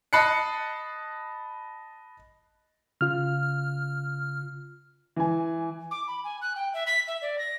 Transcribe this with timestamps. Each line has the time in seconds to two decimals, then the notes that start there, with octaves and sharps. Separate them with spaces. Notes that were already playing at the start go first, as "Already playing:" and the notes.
0.13 D#5 A5 B5 F#6 C7 C#7
3.01 C#3 F4 F6
5.16 E3 G#5
5.91 D6
6.08 B5
6.24 G#5
6.42 F#6
6.56 G5
6.74 E5
6.87 B6
7.08 E5
7.22 D5
7.38 A#6